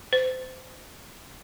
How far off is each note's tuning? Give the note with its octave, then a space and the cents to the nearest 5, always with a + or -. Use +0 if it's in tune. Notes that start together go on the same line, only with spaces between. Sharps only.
C5 -30